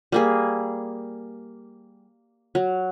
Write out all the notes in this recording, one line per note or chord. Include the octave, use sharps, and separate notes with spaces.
G3 A#3 G#4
F#3